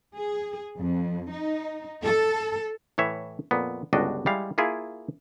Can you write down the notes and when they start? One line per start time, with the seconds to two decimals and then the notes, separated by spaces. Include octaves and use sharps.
0.15 G#4
0.78 F2
1.31 D#4
2.03 A4
2.98 A2 E3 C#5 E5
3.51 F2 A#2 B3
3.93 G1 C#2 G3 D4 F#4 D#5
4.26 G3 G#3 E4 F5
4.58 A#3 E4 F4 G#4 G#5